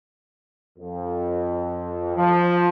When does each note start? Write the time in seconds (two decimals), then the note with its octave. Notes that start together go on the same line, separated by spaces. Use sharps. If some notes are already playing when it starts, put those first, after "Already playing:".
0.79 F2
2.16 F3